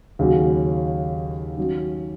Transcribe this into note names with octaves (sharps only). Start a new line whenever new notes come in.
D#2 C#3 F#3 C#4 F#4
D#3 F#3 C#4 F#4